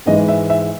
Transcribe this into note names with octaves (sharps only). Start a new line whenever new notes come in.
G#2 E3 G#3 D#5
E5
E5